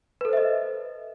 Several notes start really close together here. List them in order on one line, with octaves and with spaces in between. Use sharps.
B4 A4 C5 E5 D#5